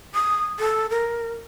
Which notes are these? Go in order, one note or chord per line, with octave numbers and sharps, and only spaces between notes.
D#6
A4
A#4